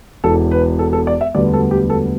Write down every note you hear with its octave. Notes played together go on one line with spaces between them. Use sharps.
E1 E2 E3 B3 A4
B4
A4
A4
D5
E5
E1 D2 D3 G3 B3 D5
A4
G4
A4